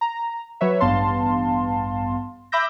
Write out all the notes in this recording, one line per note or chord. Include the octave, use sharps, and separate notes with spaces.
A#5
F#3 B4 C#5 E5
A1 G2 B3 F5 A5 C6
E5 B5 D6 E6 G6 A#6